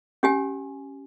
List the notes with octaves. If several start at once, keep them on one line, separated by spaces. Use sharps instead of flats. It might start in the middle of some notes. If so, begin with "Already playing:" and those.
C#4 G4 G#5